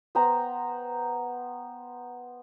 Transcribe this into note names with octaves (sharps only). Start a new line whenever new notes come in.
B3 C5 G5 A#5